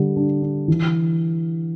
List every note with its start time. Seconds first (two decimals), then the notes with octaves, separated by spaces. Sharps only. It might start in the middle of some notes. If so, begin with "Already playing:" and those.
Already playing: D3 G3
0.16 D4
0.42 D4
0.68 E3